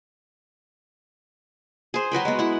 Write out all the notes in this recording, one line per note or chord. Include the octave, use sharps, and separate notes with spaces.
G#4 C5
F#3 F#4 B4 G5
G#3 B3
E4 F#5